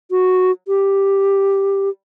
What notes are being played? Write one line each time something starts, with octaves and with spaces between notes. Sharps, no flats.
F#4
G4